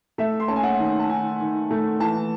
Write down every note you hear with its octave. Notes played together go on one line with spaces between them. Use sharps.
A3 E5
C6
C#4 A5
G#5
F#5
D#3
A5
D#3 G#5
D#3
A3
E3 A5